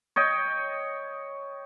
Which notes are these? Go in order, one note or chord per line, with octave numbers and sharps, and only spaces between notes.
C#5 D#5 G5